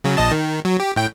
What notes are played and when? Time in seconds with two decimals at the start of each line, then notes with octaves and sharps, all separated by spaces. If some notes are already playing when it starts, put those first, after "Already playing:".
0.04 C#3 F#3
0.17 A#1 D#5 A5
0.31 D#3
0.65 F#3
0.80 G4
0.96 A2 G5